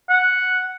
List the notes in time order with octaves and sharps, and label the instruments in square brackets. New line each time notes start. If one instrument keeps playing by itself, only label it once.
[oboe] F#5